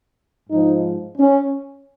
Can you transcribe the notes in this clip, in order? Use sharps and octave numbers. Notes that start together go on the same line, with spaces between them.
G#2 F3 D#4
C#4